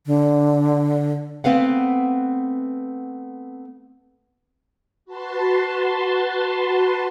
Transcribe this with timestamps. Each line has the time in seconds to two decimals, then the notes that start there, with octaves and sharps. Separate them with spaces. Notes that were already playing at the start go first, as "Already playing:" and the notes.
0.06 D3
1.44 A3 B3 C4 B4 F5 F#5
5.05 F#4 B4 A5 C6